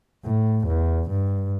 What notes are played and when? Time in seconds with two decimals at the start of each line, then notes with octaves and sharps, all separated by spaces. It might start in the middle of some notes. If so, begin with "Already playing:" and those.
0.25 A2
0.67 E2
1.10 G2